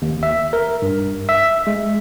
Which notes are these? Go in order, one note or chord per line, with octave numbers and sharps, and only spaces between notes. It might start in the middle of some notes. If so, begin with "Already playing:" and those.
D#2
E5
A#4
G2
E5
G#3